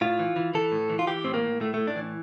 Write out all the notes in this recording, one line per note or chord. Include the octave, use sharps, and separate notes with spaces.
A2 F4
E3
E3
E3 A4
A2
E3
F4
E3 G4
A2 C4
A#3
A2
A2 A3
A2 A3
D4
E3